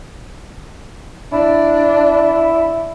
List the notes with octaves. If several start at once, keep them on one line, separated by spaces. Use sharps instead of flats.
D4 E4